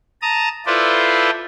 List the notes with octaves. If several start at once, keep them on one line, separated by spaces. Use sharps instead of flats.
A5 A#5 D#6
E4 F4 A4 B4 C5 D5